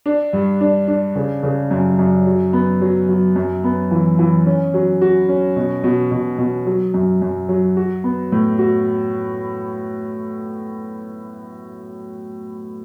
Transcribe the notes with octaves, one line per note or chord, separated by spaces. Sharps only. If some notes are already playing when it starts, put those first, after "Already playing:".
D4
G2
D4
D4
C#3
C#3
F#2
F#2
F#3
B3
F#3
F#3
F#2
B3
E3
E3
C#4
F#3
F#4
C#4
B2
B2
B2
B2
F#3
F#2
F#2
F#3
F#4
B3
A2
F#4